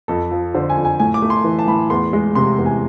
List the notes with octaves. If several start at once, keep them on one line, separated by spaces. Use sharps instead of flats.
F2 A4
F3
D3 C5
G#5
F2
G#5
A2 G#5
D6
A3
C6
E3
A5
A2 B5
E2 C6
G#3
C3 C6
E2
G#5